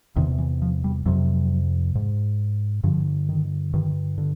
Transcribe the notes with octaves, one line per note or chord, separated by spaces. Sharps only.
E2 C3 D#3
E3
F3
G3
F2 C3 F#3
G#2
G2 D3 F3
D#3
G2 D3 D#3
D3